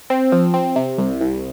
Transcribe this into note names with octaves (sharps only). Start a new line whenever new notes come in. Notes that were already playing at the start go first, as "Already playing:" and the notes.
C4
F3
C4
C3
C2
C2